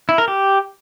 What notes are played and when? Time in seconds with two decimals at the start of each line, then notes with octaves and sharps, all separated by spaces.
0.09 E4
0.18 A#4
0.28 G4